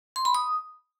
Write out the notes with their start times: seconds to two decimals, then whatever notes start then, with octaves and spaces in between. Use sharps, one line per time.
0.16 C6
0.25 B5
0.35 D#6